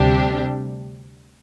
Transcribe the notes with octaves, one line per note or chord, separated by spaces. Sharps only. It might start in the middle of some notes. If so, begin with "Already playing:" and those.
Already playing: D2 C3 G3 D4 G4